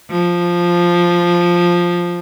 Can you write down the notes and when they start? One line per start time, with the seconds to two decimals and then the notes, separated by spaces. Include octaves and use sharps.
0.10 F3